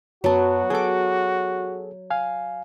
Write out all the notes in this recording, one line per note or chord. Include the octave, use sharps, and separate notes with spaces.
F#2 F#3 B3 F#4 A5
F#3 G#4 A4 D6
F5 G#5